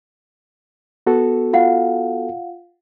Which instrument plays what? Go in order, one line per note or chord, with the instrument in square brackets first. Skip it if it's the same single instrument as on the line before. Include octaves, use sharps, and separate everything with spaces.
[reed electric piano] B3 F#4 A4
[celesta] F4 F5 F#5